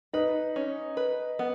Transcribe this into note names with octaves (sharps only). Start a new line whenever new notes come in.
D#4 B4
C#4
B4
B3